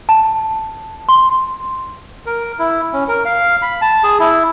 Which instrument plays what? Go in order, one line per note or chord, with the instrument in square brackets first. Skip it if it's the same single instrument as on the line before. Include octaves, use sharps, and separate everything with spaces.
[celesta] A5
C6
[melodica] A#4
E4
C#4
A#4
F5
B5
A5
G#4
E4